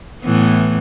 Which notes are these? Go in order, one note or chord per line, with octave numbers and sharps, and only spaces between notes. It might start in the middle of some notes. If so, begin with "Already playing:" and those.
A2 E3 B3